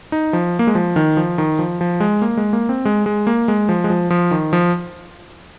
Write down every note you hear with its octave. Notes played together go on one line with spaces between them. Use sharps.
D#4
F3
A#3
G#3
F3
D#3
F3
D#3
F3
F3
G#3
A#3
G#3
A#3
C4
G#3
G#3
A#3
G#3
F3
G#3
F3
F3
D#3
F3